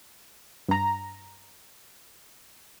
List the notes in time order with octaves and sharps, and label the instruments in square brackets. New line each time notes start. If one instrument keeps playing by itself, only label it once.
[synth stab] G2 A#5